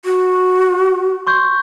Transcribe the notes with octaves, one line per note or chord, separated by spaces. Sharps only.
F#4
C6 C#6 G6